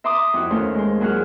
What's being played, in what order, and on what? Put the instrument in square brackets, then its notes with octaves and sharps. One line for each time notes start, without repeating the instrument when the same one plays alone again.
[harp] E5 A#5 C6 D6 D#6
F2 E4 F#4
D#2 A3 C#4 C5 F5
G#3 C5
A#2 F#3 G#4 C5 F#5 F6